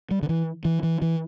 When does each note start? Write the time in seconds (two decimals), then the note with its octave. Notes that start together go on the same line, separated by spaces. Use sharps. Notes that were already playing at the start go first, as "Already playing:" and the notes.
0.11 G3
0.23 D3
0.29 E3
0.65 E3
0.83 E3
1.02 E3